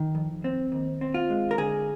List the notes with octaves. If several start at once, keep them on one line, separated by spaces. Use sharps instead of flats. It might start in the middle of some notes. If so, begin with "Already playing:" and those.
Already playing: D#3
F2
C4
D#2
C4
F4
G#3
A#4
D3 G#4